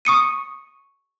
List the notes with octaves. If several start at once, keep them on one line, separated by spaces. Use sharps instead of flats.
C#6 D#6 C#7 D#7